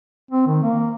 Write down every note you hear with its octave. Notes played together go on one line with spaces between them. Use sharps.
C4
D#3
A#3